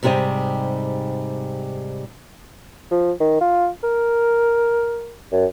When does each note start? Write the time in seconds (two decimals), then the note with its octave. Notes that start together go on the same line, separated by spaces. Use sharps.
0.03 G#2 C3 G3 G4 C5 D#5
2.91 F3
3.20 D#3
3.41 F4
3.83 A#4
5.32 F#2